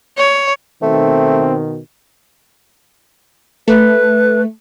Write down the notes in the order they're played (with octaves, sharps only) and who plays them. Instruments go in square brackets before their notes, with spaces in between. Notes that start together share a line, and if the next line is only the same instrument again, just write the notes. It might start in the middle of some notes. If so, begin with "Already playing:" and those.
[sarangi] C#5
[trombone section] B2 D#3 [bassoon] A3 [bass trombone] C4
[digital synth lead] A3 [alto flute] B4